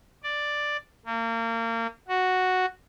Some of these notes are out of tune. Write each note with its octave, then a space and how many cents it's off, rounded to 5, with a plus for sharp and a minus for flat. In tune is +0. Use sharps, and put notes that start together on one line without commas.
D5 +5
A#3 -30
F#4 +0